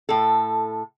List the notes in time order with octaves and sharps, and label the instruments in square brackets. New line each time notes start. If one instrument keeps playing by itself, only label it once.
[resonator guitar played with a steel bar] A2 A4